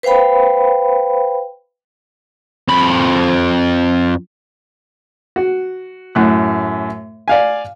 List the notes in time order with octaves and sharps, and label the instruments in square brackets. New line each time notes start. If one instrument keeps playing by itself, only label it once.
[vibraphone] B4 C5 F5 G5 B5
[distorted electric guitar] F2 B5
[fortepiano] F#4
F#2 A2 F#6
D5 F5 G#5